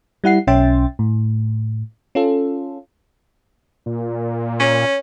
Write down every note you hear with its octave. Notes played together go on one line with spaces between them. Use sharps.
G3 E4 F#5 C7
B1 C#4 E5 G5 C6 A6
A2
C#4 F4 A4
A#2
C#4 C#5